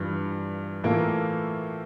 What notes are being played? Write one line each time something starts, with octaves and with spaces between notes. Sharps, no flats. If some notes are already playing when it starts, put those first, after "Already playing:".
Already playing: G2 E3 F4
A2 E3 A#3 F4 A4